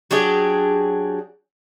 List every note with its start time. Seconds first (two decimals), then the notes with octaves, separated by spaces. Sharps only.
0.11 F#3 D4 G4 G#4